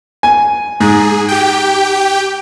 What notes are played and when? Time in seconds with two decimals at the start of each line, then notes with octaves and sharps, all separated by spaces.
0.23 G#5
0.80 G#2 G#4
1.28 G4 G5